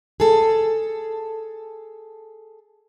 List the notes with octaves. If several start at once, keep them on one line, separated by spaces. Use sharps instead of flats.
G#4 A4